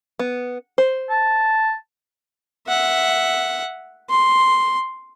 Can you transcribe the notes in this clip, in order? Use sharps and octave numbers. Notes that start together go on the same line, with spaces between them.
B3
C5
A5
E5 F#5
C6